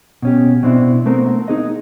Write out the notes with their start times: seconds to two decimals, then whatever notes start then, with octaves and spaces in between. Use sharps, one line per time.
0.22 B2 C#4 G4
0.63 B2 C4 D4 E4
1.06 A3 B3 C4 A#4
1.48 D#4 G#4 D#5